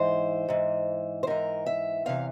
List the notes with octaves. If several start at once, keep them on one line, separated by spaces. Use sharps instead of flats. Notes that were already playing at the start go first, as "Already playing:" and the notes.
Already playing: G#2 E3 C5
G#2 E3
C5
G#2 E3 A#4
E5
E2 C3 E3 F5